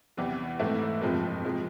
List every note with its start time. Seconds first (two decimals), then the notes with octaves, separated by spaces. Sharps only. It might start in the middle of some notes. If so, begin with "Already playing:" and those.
0.17 E2 C3 E3 G3
0.59 G#2 E3 A3 C4 E4
1.02 F#1 F2 C3 F3 G#3
1.45 C3 F3 G#3